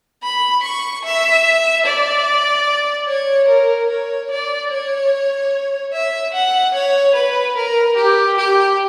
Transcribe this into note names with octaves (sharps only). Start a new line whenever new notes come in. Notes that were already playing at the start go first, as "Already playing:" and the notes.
B5
C#6
E5
D5
C#5
A#4
C#5
D5
C#5
E5
F#5
C#5
B4
A#4
G4
G4